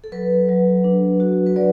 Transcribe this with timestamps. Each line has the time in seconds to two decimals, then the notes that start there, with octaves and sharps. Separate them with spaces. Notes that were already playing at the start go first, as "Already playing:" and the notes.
0.04 A4
0.12 F#3 B4
0.49 F#3
0.84 D4
1.20 F#4
1.46 B4
1.56 F#3 D5